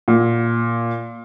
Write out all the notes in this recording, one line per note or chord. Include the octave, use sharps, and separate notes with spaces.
A#2